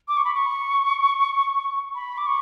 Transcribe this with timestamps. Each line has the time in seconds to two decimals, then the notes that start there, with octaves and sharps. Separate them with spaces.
0.08 D6
0.17 C#6
0.25 B5
0.35 C#6
1.95 B5
2.17 D6
2.26 C#6